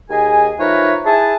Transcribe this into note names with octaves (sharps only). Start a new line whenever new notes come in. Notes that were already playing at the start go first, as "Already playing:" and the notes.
D#2 G#4 D#5 G#5
F3 D#4 A#4 B4 C#5 E5
E4 G#4 G#5 A5